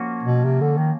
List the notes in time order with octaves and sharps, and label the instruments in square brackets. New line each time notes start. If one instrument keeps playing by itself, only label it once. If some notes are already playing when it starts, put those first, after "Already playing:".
Already playing: [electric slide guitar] F3 A#3 C#4 F#4
[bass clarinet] B2
C3
D3
D#3